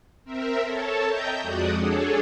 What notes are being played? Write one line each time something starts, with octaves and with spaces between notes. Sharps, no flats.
C4 A#4 E5
A4 C#5 A5
D#5 E5 G5 A#5 G6
F2 G#3 F#4 D5 F#5 D#6
D4 G#4 A4 C#5